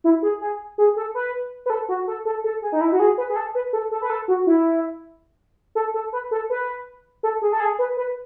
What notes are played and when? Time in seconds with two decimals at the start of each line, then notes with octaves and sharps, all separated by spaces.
0.04 E4
0.22 G#4
0.41 G#4
0.78 G#4
0.96 A4
1.15 B4
1.66 B4
1.70 A4
1.89 F#4
2.07 A4
2.25 A4
2.44 A4
2.62 G#4
2.72 D#4
2.81 E4
2.92 F#4
3.00 G#4
3.18 B4
3.30 G#4
3.36 A4
3.55 B4
3.73 A4
3.91 A4
4.02 B4
4.10 A4
4.28 F#4
4.47 E4
5.75 A4
5.94 A4
6.13 B4
6.31 A4
6.50 B4
7.23 A4
7.42 G#4
7.52 A4
7.60 G#4
7.79 B4
7.97 B4